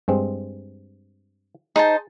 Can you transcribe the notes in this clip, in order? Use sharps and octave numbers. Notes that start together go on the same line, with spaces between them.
G2 G#3 C4
D#4 G#4 C5 A5